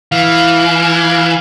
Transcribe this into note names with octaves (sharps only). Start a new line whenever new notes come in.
E3 F5
F5